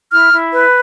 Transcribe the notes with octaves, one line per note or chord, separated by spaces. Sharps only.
E4 F6
E4
B4